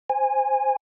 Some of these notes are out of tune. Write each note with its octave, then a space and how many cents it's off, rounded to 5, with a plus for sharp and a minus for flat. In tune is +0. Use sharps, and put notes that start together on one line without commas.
C5 +0 G#5 -15